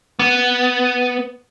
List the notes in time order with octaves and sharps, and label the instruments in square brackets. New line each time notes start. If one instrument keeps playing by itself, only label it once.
[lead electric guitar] B3